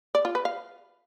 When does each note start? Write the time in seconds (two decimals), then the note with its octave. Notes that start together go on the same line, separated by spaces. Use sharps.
0.15 D5
0.25 F4
0.35 B4
0.45 F5